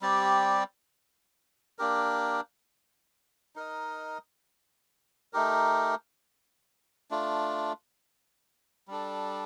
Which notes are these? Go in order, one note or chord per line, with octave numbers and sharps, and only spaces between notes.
G3 C4 G4 D5
A#3 D4 G4 A#4
D#4 A#4 D#5
A3 D#4 G4 A#4
A3 D4 F4
G3 D4 A4